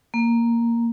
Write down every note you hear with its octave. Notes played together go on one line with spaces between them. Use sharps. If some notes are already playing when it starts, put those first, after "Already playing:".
A#3